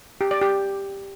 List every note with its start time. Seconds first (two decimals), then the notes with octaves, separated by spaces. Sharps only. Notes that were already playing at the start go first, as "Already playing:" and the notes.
0.21 G4
0.31 D5
0.41 G4